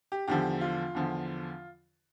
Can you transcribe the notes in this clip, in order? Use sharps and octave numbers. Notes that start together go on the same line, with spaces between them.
G4
E2 D3 F3 G4
F4
E2 D3 F3